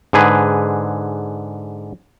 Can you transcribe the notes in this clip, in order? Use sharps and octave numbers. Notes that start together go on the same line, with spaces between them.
G#2 D3 G#4 B4